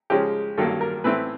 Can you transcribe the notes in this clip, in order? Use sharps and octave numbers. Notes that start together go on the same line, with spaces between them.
C#3 F3 G#3 C#4 G4
G2 D#3 F#3 A#3 A4
A#4
A2 E3 A3 C4 B4